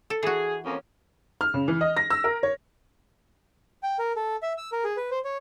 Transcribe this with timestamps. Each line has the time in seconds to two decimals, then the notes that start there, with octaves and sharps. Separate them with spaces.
0.10 A4
0.23 E3 F#4 G#4
0.65 F2 A#3 C#4
1.41 F6
1.54 C#3
1.68 E3
1.81 D#5
1.97 A#6
2.10 E6
2.24 A#4
2.43 C#5
3.83 G5
3.99 A#4
4.16 A4
4.42 E5
4.58 E6
4.72 A#4
4.84 G#4
4.97 B4
5.11 C5
5.24 C#5